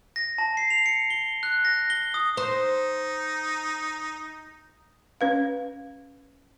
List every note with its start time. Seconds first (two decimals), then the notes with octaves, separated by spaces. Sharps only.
0.16 A#6
0.38 A5
0.57 C7
0.70 F7
0.86 C#7
1.10 G7
1.43 F#6
1.65 A#6
1.90 G7
2.14 D#6
2.37 D#4 C5
5.21 C#4 B4 F5